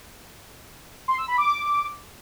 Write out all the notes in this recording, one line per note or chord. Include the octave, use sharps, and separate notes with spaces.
C6
E6
B5
D6